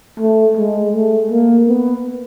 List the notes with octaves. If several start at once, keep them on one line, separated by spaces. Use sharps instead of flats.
A3
G#3
A3
A#3
B3